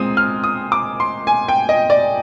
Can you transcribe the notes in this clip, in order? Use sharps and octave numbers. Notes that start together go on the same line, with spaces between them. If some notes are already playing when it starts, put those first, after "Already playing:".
Already playing: A#2 G#3 C4 D#6
F6
D#6
D6
C6
G#5
G5
D#5
D5